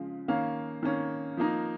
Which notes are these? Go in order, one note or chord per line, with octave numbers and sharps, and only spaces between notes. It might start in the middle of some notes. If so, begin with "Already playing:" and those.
Already playing: C#3 F3 G#3
D#3 A#3 C#4 F5
D#3 A#3 C#4
F3 A#3 D#4